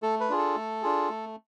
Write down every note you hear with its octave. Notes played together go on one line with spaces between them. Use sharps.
A3 A4
B4
D4 F4 G#4
A4
A3
D4 F4 G#4
A3